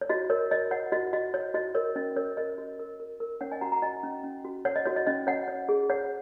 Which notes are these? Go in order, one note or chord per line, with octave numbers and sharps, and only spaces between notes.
C#5
F#4 D#5
A#4 C#5
C#5 D#5
C#5 F#5
F#4 D#5
F#4 D#5
C#5
F#4 D#5
A#4 C#5
C#4 D#5
A#4 C#5
A#4 D#5
F#4
A#4
A#4
A#4
C#4 C#5 F#5
D#5 G#5
F#4 F#5 A#5
F#5 A#5
F#4 D#5 G#5
C#4
C#4
F#4
C#5 F#5
D#5
F#4 C#5
D#5
C#4 D#5
C#5 F#5
C#5
G#4
C#5 F#5